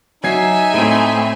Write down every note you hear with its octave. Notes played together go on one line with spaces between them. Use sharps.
F#3 D#4 E5 G#5 G#6 C7
A2 A3 C4 D7 D#7